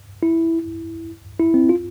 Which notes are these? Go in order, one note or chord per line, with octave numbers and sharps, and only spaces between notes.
E4
E4
C4
F4